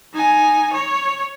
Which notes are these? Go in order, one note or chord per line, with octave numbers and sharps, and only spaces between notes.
D#4 G#5
C#5